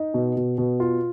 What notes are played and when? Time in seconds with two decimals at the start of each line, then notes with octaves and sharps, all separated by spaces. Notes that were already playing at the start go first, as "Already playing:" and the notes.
Already playing: D#4
0.14 B2
0.36 B2
0.58 B2
0.80 F4